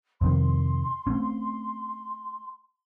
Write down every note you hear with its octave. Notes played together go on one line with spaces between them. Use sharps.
F2 C3 D#3 C6
A3 C4 C#4